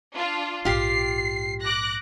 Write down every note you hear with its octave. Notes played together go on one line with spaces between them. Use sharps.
D4 F4
A#1 G#2 F4 G4 C7
D6 F#6 A#6